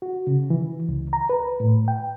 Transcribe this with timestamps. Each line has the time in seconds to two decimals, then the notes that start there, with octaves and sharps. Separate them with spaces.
0.02 F#4
0.27 C#3
0.50 E3
0.89 C#2
1.13 A#5
1.30 B4
1.60 A2
1.88 G5